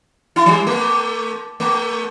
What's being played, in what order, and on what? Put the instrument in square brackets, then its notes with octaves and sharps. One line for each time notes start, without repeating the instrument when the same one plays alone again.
[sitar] E4
F3
G3
A3
A3